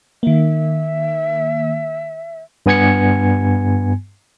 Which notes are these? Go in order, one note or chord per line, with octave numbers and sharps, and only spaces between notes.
D#3 A#3 E5
G2 B3 G#5 G#6 C#7